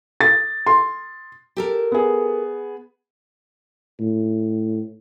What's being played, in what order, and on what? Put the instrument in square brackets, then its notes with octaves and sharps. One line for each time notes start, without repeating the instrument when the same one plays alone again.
[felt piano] A6
C6
[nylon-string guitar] G4 A4 A#4
[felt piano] B3 G#4
[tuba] A2